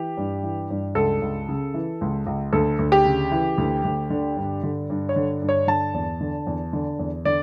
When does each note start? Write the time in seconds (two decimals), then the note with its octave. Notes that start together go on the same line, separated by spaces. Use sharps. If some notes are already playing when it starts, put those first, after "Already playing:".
Already playing: E3 G4
0.17 G2
0.43 E3
0.70 G2
0.95 C#2 A4
1.22 C#2
1.49 C#3
1.74 E3
2.01 C#2
2.26 C#2
2.53 D2 A4
2.79 D2
2.92 G4
3.05 C#3
3.31 E3
3.58 D2
3.84 D2
4.10 D3
4.36 G2
4.63 D3
4.90 G2
5.09 C#5
5.16 D3
5.42 G2
5.49 C#5
5.67 D3 A5
5.94 E2
6.21 D3
6.47 E2
6.73 D3
6.99 E2
7.25 D3 D5